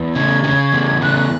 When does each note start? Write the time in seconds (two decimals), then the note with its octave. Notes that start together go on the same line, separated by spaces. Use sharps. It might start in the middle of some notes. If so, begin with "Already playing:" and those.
Already playing: E2
0.14 C#3 G#6
0.44 C#3
0.72 E2
1.02 C#3 F#6